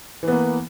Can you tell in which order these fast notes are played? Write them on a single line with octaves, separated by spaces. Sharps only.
E3 B3 A#3